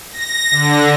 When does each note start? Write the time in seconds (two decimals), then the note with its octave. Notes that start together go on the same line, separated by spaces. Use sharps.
0.11 A#6
0.51 D3